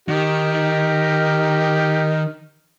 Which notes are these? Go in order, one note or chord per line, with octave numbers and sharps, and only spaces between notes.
D#3 D#4 G4 A#4